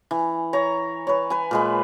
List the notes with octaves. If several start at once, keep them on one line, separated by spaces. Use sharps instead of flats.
E3
C#5 A#5
B4 C#5
B4 G#5
A#2 G#3 B4